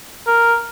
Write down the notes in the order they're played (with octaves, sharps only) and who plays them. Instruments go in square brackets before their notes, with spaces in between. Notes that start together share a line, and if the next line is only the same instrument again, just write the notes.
[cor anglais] A#4